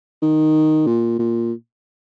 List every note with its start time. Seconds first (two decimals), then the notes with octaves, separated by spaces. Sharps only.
0.22 D#3
0.87 A#2
1.19 A#2